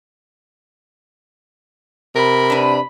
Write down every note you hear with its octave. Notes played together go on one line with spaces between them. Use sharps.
C3 A#4 B5
D4 B4